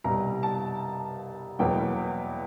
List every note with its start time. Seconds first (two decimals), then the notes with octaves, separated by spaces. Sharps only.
0.04 C2 B2 G3 A#5
0.43 A5
1.59 E2 B2 F#3 A#3 G5